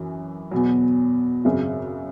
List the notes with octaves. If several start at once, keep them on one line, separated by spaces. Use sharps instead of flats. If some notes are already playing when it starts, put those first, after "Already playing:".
Already playing: F#2 E3
E2 B2 F#3
G#1 F#2 C#3